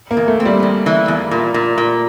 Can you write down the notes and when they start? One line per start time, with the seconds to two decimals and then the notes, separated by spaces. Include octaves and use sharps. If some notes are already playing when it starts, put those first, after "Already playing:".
0.11 A#3
0.17 E2
0.28 A3
0.40 C4
0.45 G3
0.63 E2
0.86 E3
1.08 E2
1.31 A#2
1.54 A#2
1.78 A#2